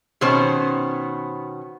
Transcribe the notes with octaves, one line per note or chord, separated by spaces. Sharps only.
B2 D#3 B3 C#4 C5